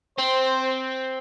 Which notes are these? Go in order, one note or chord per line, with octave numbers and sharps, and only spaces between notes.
C4 C5